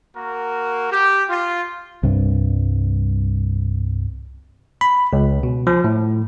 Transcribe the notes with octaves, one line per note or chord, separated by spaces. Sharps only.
A#3 F#4 A#4
G4
F4
C2 G2
B5
C#2
B2
F3
A2